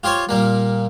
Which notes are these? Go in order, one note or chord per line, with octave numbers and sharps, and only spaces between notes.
F4 G4 C5 C#5
A#2 G3 A#3